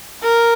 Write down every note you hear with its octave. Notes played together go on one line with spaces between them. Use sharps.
A#4